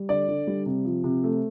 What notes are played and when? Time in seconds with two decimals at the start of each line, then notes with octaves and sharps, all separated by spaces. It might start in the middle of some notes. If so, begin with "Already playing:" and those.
Already playing: G3
0.09 D3 D5
0.28 D3
0.47 G3
0.66 C3
0.85 F3
1.04 C3
1.24 A3